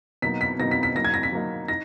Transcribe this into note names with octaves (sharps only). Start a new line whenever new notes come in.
B2 F#3 A#3 D#4 B6
B6
B2 F#3 A#3 D#4 A#6
B6
B6
F#3 A#3 D#4 A#6
G#6
A#6
B6
F#3 A#3 D#4
D#4 A#6